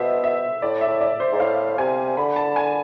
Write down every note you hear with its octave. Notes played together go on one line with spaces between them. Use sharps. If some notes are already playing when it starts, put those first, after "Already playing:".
Already playing: B2 C5 E5
E5
A2 D5
E5
A2
D5
C5
G#2
A2 F5
C3 G#5
D3 B5
A5
G#5